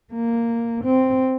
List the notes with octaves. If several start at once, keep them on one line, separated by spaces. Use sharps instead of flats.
A#3
C4